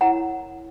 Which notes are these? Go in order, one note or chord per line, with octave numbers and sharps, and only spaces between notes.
E4 A#4 C#5 F#5 A#5